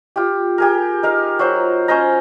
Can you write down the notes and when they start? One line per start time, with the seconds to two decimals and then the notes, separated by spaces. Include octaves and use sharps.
0.16 F4 G4
0.58 G4 G#4 A#4
1.03 D#4 A#4 F5
1.39 F#3 F4 C5
1.88 C#4 C5 D#5 A#5